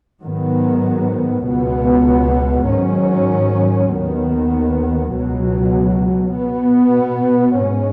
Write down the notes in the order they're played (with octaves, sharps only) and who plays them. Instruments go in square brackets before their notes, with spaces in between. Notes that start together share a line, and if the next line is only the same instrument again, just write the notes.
[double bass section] G#2 D#3 F#3 B3
C#2 B2 B3
G#2 D#3 F#3 C#4
D#2 D#3 B3
C#2 B2 F#3
B2 B3
G#2 G#3 C#4